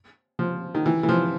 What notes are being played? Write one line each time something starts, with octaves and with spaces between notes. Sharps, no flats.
F3
D#3
E3
E3
F3